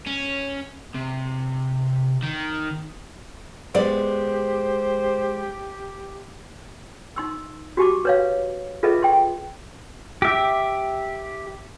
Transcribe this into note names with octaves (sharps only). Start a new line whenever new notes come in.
C#4
C3
D#3
G#3 B3 G4 C5 D5
D#4 C6 E6
F#4 G4 A5 D6
B4 C#5 F5
F4 G#4 A4 B4 D#5 E5
G5 C6
G4 E5